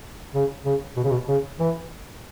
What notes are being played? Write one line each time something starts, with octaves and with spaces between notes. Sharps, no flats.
C#3
C#3
B2
C#3
B2
C#3
E3